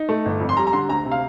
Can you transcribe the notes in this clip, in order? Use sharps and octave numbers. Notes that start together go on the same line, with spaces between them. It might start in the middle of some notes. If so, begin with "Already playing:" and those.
Already playing: D#4
A3
G1
F2
C6
G3 A#5
A#5
D3 C6
D2 A#5
C3
F5